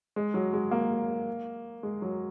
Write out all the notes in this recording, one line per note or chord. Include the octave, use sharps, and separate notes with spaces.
G#3
F#3
G#3
A#3
G#3
F#3